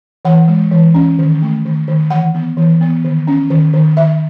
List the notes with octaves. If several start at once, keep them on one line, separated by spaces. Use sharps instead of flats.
E3 F#5
G#3
E3
C#4
D#3
A3
D#3
D#3
E3 F#5
B3
E3
B3
D#3
C#4
D#3
D#3
D#3 E5